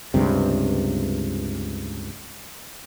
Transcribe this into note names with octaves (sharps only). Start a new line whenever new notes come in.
C#2 G2 C3